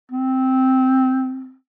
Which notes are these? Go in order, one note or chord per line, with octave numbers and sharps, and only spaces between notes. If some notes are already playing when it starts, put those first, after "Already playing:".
C4